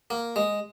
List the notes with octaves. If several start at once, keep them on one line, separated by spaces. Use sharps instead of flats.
A#3
G#3